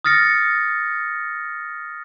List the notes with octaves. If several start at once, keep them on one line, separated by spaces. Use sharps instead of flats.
D#6 F6 A6 A#6 C#7